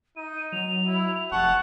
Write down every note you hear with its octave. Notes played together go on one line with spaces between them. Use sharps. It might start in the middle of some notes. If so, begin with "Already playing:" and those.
D#4 D#7
F#3 F7
E4
F1 F#5 A5 C#6